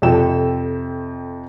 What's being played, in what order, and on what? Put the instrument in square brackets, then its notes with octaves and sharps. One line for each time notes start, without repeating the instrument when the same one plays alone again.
[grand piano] F2 C3 A4 G5 E7